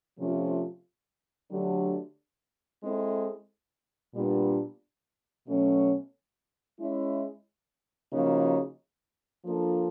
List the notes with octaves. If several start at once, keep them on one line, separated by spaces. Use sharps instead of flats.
C3 F3 A3 C#4 F4
D3 F#3 A3 D4 G4
G#3 C4 E4 A4
A#2 G3 B3 D4
B2 F#3 A3 C#4
G#3 C#4 E4
C#3 F3 A#3 D#4 F#4
F3 A#3 D4 F4 A4